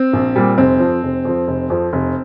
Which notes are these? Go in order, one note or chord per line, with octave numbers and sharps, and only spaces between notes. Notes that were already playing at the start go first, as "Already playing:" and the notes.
Already playing: C4
A#1
A#2 G3
F1 C4
F3
F2
F1
F2 F3
F1
F2 F3
F1